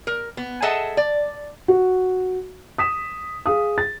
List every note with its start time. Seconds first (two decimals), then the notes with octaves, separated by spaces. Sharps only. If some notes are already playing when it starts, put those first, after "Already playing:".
0.07 A#4
0.37 B3
0.62 G#4 A4 D#5 E5 F#5 A5
0.97 D5
1.68 F#4
2.78 D#6 B6 E7
3.46 G#4 F5 D#6
3.78 A6